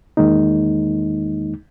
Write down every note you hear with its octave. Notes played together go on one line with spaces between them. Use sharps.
E2 D#3 G#3 A#3 D#4